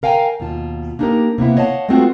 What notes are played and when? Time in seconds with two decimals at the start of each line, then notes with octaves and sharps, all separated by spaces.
0.03 A#4 F5 G5 G#5 A#5
0.40 D#2 B2 F4 A5
0.99 A#3 D4 D#4 F#4 G4 A#4
1.38 C3 A#3 B3 E4
1.57 C#5 D#5 F5 F#5 A5
1.89 G#3 A3 B3 C4 F4 F#4